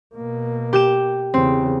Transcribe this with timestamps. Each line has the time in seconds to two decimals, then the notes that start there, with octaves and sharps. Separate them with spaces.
0.15 B2 A#3
0.73 G4 G6 E7
1.34 E2 C#3 C4